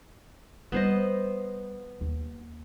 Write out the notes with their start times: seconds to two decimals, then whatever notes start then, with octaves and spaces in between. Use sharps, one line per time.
0.72 G3 B3 C5 D#5
2.01 D#2